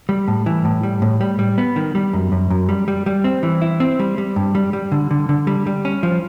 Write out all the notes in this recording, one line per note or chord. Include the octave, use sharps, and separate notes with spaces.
G3
A2
E3
A2
G3
A2
G3
G3
B3
D#3
G3
F#2
F#2
F#2
G3
G3
G3
C4
E3
E4
C4
G3
G3
G2
G3
G3
D3
D3
D3
G3
G3
C#4
F3